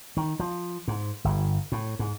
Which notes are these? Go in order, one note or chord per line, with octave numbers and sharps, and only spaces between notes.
D#3
F3
G#2
G1
A2
G#2